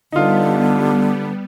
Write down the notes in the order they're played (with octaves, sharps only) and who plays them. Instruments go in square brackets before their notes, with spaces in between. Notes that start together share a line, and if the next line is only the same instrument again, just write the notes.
[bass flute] D3 [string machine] G3 B3 [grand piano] D#4 F4